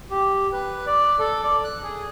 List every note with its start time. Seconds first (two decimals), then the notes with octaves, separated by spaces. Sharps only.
0.11 G4
0.53 B4
0.86 D5
1.19 A4
1.43 D5
1.64 F#6
1.83 G#4